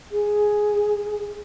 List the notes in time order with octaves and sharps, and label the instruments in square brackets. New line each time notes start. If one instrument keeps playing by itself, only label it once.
[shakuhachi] G#4